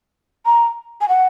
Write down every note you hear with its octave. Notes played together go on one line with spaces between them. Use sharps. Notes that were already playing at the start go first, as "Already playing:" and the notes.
A#5
G#5
F#5